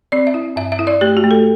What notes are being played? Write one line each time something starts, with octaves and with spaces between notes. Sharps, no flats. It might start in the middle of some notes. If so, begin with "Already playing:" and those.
C4 D5
E5
E4
G2 E5
E5
E4
D5
A3 G4
F#4
A3
A4